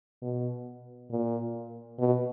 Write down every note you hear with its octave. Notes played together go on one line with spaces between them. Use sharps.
B2
A#2
B2